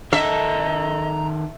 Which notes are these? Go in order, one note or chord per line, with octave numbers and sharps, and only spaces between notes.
D#3 A4 D#5 E5 A#5